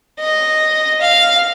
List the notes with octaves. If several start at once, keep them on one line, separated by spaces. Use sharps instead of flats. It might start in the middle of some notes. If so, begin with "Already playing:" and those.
D#5
F5